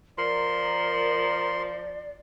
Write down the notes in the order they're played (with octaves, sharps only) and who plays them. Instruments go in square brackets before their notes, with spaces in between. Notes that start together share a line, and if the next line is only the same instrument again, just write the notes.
[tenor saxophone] F3 [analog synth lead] A#4 [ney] D5 [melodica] C6